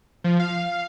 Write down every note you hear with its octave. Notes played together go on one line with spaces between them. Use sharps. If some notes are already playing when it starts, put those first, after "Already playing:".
F3
F5